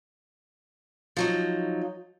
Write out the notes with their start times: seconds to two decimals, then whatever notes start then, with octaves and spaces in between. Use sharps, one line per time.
1.17 F3 F#3 D#4